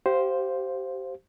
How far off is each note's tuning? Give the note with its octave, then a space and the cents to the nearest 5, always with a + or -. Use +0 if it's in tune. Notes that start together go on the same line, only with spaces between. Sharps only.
G4 -25 C5 +0 F5 +0